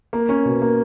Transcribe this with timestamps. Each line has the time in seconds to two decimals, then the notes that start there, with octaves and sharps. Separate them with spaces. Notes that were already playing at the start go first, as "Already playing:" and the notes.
0.13 A#3
0.29 C#4
0.45 B2
0.62 A#3